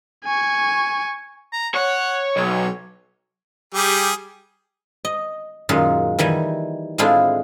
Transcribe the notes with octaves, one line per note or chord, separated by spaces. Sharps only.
G#5 C#6
A#5
C#5 F#5
B1 C#5
G3 G4 G#4
D#5
F#2 A#2 D#3 G#3 F4
D#3 E3 G3 G#5
A2 G#3 C4 D4 E4 F4